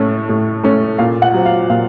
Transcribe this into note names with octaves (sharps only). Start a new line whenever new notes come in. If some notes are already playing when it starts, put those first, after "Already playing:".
Already playing: A2 A3 C#4
A2
A3 C#4
A#2 F5
F#5
F#3 C4
F5
A#2 F5